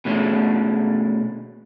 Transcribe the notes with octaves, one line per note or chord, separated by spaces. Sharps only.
B2 G#3 A3 C#4 D4